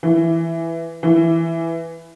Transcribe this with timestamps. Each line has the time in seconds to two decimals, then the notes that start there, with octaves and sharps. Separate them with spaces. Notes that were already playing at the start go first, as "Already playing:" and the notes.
0.03 E3
1.03 E3